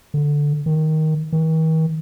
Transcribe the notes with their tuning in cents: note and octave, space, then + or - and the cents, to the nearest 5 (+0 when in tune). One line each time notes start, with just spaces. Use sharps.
D3 -5
D#3 +10
D#3 +45